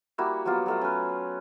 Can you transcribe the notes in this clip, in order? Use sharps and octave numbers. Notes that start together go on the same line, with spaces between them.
G3 A#3 E4 F#4
F#3 G3 B3 F4
F#3 A3 F4
C#4 B4